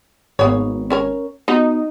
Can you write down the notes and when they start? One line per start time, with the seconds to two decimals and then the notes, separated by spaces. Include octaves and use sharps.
0.39 G#1 A#3 B3 C#5
0.90 C#4 A#4 C#5
1.48 B3 D#4 F#4